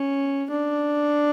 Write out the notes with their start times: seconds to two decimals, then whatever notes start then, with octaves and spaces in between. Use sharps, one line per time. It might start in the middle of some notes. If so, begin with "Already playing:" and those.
Already playing: C#4
0.50 D4